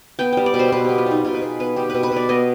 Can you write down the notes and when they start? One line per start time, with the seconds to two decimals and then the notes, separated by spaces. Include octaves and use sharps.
0.19 B3 G5
0.33 G3 G5
0.46 D5
0.54 B2
0.59 C5
0.72 B2 B4
0.85 B3 G4
0.98 F4
1.06 G3 D#4
1.24 B2 F4
1.34 B4
1.41 B2 G#4
1.60 B3 B4
1.76 G3 G4
1.90 B2 B4
2.03 B4
2.12 B2 D5
2.29 B3 D#5